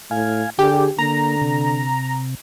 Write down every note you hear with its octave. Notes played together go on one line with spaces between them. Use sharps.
A2 F5 G#5
D3 G4 G#4
D3 A#3 A#5
C3